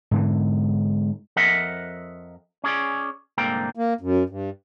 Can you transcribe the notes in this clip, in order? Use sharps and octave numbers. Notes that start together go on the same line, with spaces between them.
G#2 D3 E3
F2 F3 A#4 D#5 E5 F#5
C#4 G#4 D5
C2 G#2 D3 A#3 G5
A#3
F#2
G2